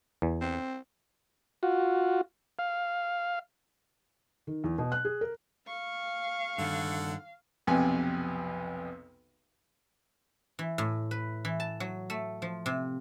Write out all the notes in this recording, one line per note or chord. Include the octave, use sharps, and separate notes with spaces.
E2
C4
F4 F#4
F5
D#3
E2
B2
F#6
G#4
A#4
F5 C#6
G2 D3 D#3 A4 F#5
B1 F2 C3 B4 G#5
E3
A2
B4
E3
A5
F#3
A3
F3
C3